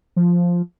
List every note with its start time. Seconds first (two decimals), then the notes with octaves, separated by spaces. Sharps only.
0.16 F3